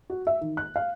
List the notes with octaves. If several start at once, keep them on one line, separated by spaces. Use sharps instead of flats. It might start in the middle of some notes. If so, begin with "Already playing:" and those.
F#4
E5
D#3
F#6
F5